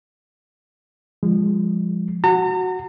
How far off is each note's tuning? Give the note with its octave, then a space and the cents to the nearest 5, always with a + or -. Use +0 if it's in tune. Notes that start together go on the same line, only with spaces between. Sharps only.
F3 +0 G#3 -25
F#4 +0 A#5 -40